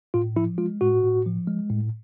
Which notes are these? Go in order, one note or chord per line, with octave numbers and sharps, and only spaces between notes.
A2 F4
F3 E4
G#3 F4
A2 F#4
A2
F3
G#3
A2